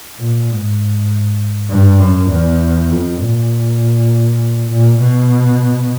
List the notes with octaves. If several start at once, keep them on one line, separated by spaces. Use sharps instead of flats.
A#2
G#2
G2
F#2
E2
F2
A#2
A#2
B2